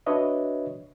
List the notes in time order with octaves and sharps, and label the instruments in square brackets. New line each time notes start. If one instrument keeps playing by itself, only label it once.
[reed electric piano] D4 F#4 B4 C#5 D#5 E5